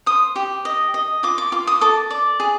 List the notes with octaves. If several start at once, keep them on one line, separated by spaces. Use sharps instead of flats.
C5 D#6
G4
D#5
D#5
F4 D6
D6
F4 D6
D#6
A4 D6
D5
G#4